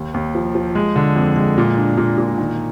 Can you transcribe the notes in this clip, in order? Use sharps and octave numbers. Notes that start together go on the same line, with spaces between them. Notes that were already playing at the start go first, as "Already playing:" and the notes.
Already playing: D#2
D#2
F3
F3
G#3
D3
F2
G#3
A#2
D4
A#2
A#2
D#3